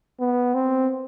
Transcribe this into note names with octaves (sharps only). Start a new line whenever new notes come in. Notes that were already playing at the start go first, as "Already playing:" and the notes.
B3
C4